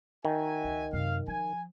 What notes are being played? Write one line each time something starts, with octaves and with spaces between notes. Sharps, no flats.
D#3 F#4 E5 G#5
C#2
F#2 C3 F5
F3 G#5